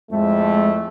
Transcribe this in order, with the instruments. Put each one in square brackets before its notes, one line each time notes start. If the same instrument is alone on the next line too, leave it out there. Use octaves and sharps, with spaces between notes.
[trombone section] F2 A2 A3 [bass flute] G#3